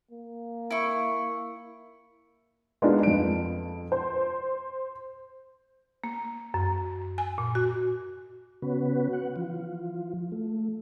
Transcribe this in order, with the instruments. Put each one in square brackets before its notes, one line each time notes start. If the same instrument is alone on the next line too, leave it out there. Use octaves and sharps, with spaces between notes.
[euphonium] A#3
[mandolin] E4 C#6
[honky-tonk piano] G#3 A#3 B3 D4 D#4 F4
F2 D7
C5
[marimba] A#3
F#2
G#5
A#2
F#4
[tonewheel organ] C#3 B3 C#4 F#4 B4
F#5
E3 F3 F4
A3